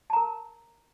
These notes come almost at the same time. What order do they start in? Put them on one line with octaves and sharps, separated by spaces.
A5 A#5 A#4